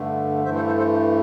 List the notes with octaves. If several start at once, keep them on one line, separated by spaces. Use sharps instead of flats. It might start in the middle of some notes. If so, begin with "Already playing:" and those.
Already playing: G2 D3 A3
G2 E3 A3 C5 E5
A4 C5
A4 C5
A4 C5